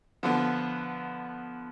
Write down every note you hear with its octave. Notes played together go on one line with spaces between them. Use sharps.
D3 F3 B3